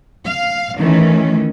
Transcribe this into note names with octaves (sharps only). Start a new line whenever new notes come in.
F5
D#3 E3 A3 C#4